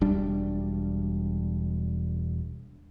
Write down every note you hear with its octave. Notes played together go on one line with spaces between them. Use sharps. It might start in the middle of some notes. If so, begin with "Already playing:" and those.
E1 G3 D4